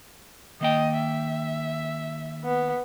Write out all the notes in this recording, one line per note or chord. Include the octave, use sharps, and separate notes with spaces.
D#3 A#3 D#5 G5
E5
B3